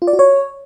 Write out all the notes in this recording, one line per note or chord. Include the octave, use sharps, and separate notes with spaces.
F4
D5
F#4
C#5